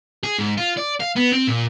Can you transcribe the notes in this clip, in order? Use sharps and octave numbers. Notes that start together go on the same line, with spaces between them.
G#4
G#2
F4
D5
F5
B3
C4
A#2